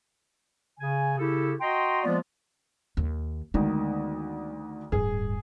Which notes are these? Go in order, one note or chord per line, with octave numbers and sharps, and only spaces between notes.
C#3 G#5
C#3 E4 G4 A4
F#4 D#5 G5 A#5 C6
F3 G#3 A#3 B3 F4 D5
D#2
D2 D#3 G#3 B3
D1 G2 G#4